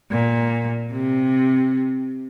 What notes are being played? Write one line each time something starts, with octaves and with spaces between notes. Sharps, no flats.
A#2
C3